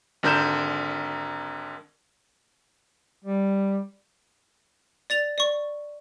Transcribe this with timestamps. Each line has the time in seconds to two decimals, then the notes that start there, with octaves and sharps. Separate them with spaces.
0.23 G#1 D3 A#4 G6 E7
3.25 G3
5.10 D5 A6 F7
5.38 D5 C#6